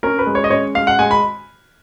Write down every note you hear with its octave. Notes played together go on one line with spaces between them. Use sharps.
C#4 A#4
B4
G#3
C#5
D#5
C#4 C#5
G#3 F5
F#5
G#3 G#5
B5